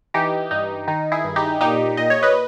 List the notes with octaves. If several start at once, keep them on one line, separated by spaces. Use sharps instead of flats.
E3 D#4 G4
G2 D#4
D#3 D#4
E4 G#4
G2
D#4 G4
A#2 D#4 G4
A#2 D#5
C#5
B4 D#5